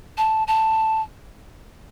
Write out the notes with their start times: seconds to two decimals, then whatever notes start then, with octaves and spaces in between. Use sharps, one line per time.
0.18 A5
0.48 A5